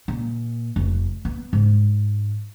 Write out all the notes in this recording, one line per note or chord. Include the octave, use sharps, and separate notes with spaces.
A#2
F1
B3
G#2